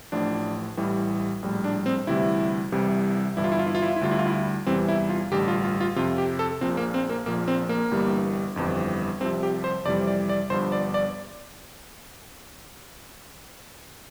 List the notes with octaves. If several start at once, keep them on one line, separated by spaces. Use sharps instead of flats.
A1 A2 F3 D4
A1 A2 E3 G3
A#1 A2 G3
D4
C4
D2 C3 E3 G3 E4
C2 C3 E3 G3
G1 G2 E3 G3 E4
F4
E4
F4
E4
F4
E4
F4
E4
D2 D3 G3 F4
E4
F4
E4
E2 C3 E3 G3 C4
E4
F4
A1 G2 D3 G3 G4
F4
F4
F4
F2 C3 F3 F4
G4
A4
A#1 A#2 F3 C4
A#3
C4
A#3
A#1 A#2 F3 A#3
C4
A#3
G1 G2 E3 G3
G1 F2 E3 G3
C2 C3 F3 C4
G4
C5
F2 C3 E3 G3 D5
D5
D5
G1 G2 F3 C5
D5
D5